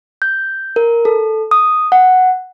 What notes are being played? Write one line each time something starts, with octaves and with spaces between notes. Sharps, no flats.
G6
A#4
A4
D#6
F#5